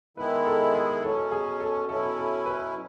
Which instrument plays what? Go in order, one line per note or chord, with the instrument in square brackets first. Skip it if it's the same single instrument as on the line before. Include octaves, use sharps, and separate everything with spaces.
[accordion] D#3 G#3 B3 E4 [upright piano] B4
[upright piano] A4
G#4
[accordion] B2 F#3 C#4 [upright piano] A4
[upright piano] G#4
A4
[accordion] B2 F#3 C#4 E4 [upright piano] A4
[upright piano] A4
B4